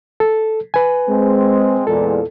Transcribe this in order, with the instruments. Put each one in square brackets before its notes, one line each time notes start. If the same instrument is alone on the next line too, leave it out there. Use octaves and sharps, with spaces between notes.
[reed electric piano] A4
B4 G#5
[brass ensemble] G#3 C4
[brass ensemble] E2 A#2 G#3 [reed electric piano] A4